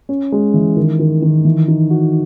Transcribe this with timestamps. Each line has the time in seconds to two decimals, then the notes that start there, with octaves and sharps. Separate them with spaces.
0.09 C#4
0.32 G#3
0.54 E3
0.77 D#3
0.99 D#3
1.22 D#3
1.45 E3
1.68 D#4
1.90 F#4